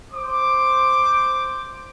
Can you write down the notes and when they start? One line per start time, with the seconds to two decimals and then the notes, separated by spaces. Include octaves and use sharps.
0.12 C5 D6